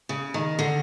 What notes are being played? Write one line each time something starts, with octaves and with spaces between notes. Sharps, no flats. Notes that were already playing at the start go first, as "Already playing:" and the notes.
C#3
D#3
D3